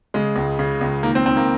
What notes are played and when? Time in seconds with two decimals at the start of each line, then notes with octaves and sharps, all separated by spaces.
0.14 C#3 G#3
0.36 C#2
0.59 C#3
0.81 C#2
1.03 D#3 A#3
1.15 C4
1.26 D#3 C4
1.37 A#3